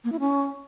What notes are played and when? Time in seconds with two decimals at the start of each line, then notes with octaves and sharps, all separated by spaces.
0.04 A#3
0.12 E4
0.20 C#4